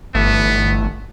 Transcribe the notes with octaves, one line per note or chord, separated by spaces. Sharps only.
G1 E3 A3 B3 E5